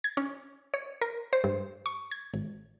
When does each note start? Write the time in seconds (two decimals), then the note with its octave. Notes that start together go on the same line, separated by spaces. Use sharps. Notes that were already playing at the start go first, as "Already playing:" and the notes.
0.04 G#6
0.17 C#4
0.74 C#5
1.01 A#4
1.33 C5
1.44 G2
1.86 C#6
2.11 G#6
2.34 G#1